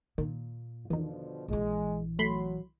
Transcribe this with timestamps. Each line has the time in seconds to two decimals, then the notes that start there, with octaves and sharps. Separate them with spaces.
0.18 A#2 D#3
0.90 E2 B2 D3 D#3 F3 F4
1.48 A#1 E3 G#3
2.19 F#3 A3 B5 C6